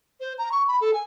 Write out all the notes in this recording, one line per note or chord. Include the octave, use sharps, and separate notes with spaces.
C5
A#5
C#6
B5
A4
G#5